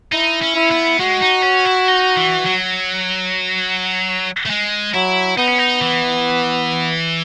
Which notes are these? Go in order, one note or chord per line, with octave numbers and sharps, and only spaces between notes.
D#4 E4
C#4
E4
B3
G#3 F#4
D#4
C#4
E4
D#4
E3
F#3
A3
G#3
F#3 E4
B3 D#4
C#4
D#4
E3